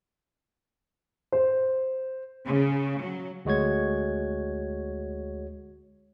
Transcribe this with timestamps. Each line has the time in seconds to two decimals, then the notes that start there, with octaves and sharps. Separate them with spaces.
1.32 C5
2.45 C#3
3.00 F#3
3.45 D2 G#3 F#4 C#5 G#6